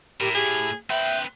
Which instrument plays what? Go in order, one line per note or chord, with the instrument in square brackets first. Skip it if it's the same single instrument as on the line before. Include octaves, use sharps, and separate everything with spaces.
[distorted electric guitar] A2 [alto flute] G4 [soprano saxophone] A#4
[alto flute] G4 [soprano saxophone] G#4
[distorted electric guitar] C4 B4 [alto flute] E5 [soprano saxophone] G5